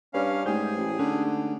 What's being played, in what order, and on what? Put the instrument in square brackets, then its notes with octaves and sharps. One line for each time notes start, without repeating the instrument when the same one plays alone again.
[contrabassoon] G2 [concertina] C#4 F5 [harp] B4 C#5 D5
[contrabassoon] G#2 [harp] G#3 A3 G4 [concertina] G#4 [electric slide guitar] C5 G5
[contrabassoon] A1
[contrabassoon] D3 [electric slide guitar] C#4 D#4 [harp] F#6